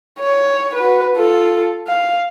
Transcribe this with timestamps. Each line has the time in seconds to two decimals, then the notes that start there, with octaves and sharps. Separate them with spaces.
0.19 C#5
0.75 F#4 B4
1.16 F4 A4
1.87 F5